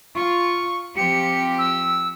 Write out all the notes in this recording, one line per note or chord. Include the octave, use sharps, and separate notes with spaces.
F4 C#6
F3 C4 G4 C#7
E6